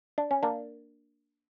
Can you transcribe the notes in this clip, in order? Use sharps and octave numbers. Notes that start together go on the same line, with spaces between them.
D4
C#4
A#3 D4